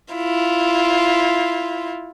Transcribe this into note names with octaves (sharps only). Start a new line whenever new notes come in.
E4 F4